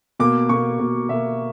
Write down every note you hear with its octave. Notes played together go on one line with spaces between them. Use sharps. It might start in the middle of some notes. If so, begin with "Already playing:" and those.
B2 A#3 D6
B2 A#3 C#6
B2 A#3
B2 A#3 E5